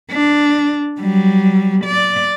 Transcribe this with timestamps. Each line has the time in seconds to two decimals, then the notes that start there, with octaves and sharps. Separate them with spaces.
0.11 D4
1.00 F#3 G3
1.85 D5